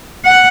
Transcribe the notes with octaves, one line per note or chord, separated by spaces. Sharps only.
F#5